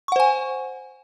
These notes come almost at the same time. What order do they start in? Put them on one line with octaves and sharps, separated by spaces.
C#6 F#5 C5 G#5